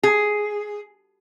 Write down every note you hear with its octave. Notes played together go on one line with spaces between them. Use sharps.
G#4